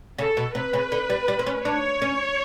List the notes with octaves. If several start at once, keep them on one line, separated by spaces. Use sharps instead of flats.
C#3 A4
B2
C3 B4
C#3
D3
G3
G3
C4
C#4
D4 C#5
C#4